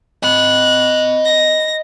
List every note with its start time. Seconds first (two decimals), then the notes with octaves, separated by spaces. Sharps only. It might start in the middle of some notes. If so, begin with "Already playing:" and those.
0.23 D#5 B5 F#6
1.25 A#6